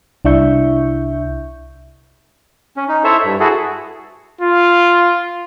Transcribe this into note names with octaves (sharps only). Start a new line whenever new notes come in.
C2 D4 E4 E5 C#6 G6
C#4
D#4
E4 A4 C5 C#5 E5
G2
E4 F#4 G#4 A4
F4